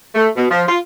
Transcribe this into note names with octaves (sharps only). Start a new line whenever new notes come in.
A3
B2
F3
F4